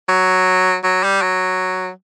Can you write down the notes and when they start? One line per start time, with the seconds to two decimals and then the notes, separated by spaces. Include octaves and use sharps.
0.09 F#3
0.84 F#3
1.03 G3
1.22 F#3